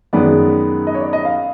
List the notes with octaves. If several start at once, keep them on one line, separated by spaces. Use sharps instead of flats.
F#2 D#3 G#3 B3 D5
D#5
C#5
D5
D#5
F5